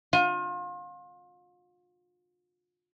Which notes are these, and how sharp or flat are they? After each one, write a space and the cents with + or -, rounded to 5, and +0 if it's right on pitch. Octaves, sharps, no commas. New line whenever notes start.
F4 +35